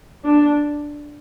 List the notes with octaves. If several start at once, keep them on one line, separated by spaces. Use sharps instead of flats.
D4